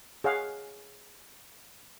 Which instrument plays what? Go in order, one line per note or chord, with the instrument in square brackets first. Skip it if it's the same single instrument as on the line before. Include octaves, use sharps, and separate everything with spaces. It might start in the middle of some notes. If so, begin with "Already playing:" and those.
[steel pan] G#4 C#5 F5 F#5